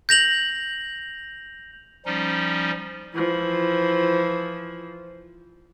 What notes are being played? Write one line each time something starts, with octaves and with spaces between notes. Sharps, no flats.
G6 A#6 F7 F#7
F3 G3 C#4 D#4
E3 F3